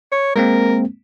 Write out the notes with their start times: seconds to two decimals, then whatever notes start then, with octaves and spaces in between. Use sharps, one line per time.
0.12 C#5
0.36 G#3 A#3 C4 A#4